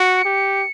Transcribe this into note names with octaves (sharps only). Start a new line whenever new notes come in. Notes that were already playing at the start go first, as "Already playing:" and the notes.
Already playing: F#4 C#7
G4